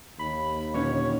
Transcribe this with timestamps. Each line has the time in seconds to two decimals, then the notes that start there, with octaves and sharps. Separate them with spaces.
0.19 D#2 B5
0.74 A#2 D3 C#4 C#5